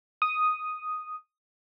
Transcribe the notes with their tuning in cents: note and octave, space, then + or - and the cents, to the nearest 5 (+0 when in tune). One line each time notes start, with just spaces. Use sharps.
D#6 +0